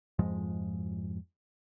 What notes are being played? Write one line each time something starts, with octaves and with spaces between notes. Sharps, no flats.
F2 G#2 F3 G#3